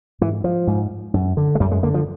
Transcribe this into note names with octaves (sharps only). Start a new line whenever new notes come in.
G#2 E3
F3
G#2
F#2
D3
G#3
F#2 G3
G#3
D3 A#3
F3